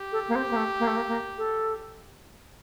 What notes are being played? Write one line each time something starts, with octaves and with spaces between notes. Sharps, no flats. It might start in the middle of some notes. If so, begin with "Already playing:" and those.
Already playing: G4
A4
A#3
C4
A#3
A3
A#3
A3
A#3
A#3
A4